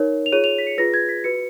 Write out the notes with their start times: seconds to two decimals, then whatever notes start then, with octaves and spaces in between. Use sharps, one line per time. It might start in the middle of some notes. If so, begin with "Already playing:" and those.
Already playing: D#4 A#4 C#5
0.26 F7
0.32 F4 G#4 C#5 D#7
0.44 F7
0.58 B6
0.67 C#7
0.78 F4 G#4 B4 A#6
0.94 G#6
1.09 B6
1.24 F#4 B4 C#7